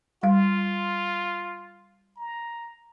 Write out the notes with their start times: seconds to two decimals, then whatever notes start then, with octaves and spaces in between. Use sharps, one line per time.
0.23 G3 F4 F5
2.16 A#5